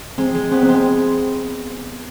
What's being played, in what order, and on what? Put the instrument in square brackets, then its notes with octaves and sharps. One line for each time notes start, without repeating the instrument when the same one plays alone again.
[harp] G#3 [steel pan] C4
[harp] G#3
[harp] B3 [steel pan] C4
[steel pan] C4
[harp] G#3
[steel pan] C4